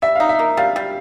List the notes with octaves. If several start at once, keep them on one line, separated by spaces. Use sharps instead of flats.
G3 E5
D#4 F5
E5
A#3
G3 F5
G3